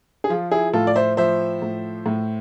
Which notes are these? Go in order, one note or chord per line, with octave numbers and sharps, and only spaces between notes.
G#4
F3 F4
E4 G#4
A2 F4 A4
D5
C5 E5
F3 C5 E5
A2
A2